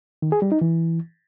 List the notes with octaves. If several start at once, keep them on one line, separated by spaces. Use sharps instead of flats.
D#3
G#4
G3
D#4
E3